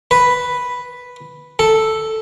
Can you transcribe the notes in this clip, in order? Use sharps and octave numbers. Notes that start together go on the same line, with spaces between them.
B4
A4